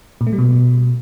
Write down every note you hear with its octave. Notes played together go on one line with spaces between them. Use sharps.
A#2
A3
G3
B2